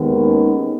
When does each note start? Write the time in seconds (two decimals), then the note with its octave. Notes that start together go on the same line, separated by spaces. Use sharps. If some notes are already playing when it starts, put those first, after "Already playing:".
Already playing: D#2 D#3 G#3 B3
0.26 C#4